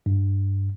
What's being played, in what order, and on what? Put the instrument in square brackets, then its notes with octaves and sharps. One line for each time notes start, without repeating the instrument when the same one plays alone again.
[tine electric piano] G2